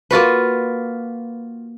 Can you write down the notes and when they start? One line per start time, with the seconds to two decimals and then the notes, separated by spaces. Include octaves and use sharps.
0.11 A#3 F4 F#4 B4